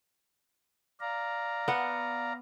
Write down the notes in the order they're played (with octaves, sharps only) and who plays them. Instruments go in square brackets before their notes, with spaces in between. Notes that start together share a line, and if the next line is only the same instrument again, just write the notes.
[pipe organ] D5 F5 A#5
[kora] B3 F#5